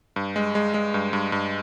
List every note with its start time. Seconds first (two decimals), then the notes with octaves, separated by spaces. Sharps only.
0.16 G2
0.36 G#3
0.55 G#3
0.74 G#3
0.94 G2
1.13 G2
1.32 G2